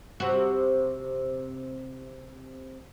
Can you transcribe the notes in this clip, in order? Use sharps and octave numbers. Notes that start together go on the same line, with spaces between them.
C3 F#4